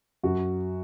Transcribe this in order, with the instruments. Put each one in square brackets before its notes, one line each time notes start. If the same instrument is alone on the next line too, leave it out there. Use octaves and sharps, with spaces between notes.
[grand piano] F#2 F#4